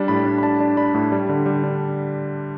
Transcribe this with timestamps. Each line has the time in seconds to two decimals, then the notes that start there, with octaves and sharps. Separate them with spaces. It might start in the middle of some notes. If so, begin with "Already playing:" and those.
Already playing: G3 D4 A5
0.08 A2 B5
0.26 D4
0.38 B5
0.43 D4 A5
0.60 D4
0.77 D4 B5
0.94 A2
1.12 G3
1.29 D3
1.46 G3
1.63 D4